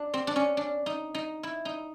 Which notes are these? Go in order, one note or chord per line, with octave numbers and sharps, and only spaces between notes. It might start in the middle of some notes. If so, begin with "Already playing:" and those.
Already playing: D4
C4
D4
C#4
D4
D#4
D#4
E4
D#4